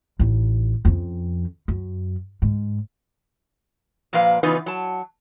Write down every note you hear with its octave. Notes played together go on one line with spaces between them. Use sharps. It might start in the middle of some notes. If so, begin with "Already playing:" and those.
A1 D#4
F2 C#4
F#2
G#2
A#2 F3 A#3 B4 F5
C#3 E3 B3 D#4 F4 B4
F#3 A5